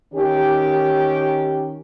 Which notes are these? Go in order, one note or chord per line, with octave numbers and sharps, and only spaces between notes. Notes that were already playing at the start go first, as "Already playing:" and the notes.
D#3 C#4 G4